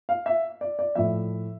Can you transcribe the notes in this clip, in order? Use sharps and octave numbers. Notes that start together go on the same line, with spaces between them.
F5
E5
D5
D5
A2 F3 E5